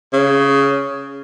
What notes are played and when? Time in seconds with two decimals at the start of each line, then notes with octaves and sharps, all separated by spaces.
0.13 C#3